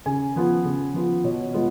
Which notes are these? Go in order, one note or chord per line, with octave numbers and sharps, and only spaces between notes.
C#3 G#5
F3 B3 F4
C#3
F3 B3 F4
B2 C#5
G#3 B3 F4